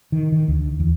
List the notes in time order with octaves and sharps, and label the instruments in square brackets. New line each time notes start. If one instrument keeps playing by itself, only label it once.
[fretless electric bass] D#3
D#3
D2
E2